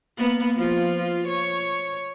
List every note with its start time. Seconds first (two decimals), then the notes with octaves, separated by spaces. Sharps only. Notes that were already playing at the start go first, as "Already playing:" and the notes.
0.17 A#3 B3
0.56 F3 F4
1.27 C#5